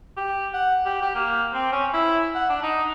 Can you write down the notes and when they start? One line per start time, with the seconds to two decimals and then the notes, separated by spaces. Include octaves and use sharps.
0.17 G4
0.53 F#5
0.86 G4
1.02 G4
1.15 A#3
1.53 C4
1.72 C#4
1.94 E4
2.35 F#5
2.49 D4
2.63 D#4